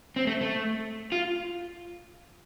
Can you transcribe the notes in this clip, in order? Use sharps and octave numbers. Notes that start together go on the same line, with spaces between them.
C4
A3
A3
F4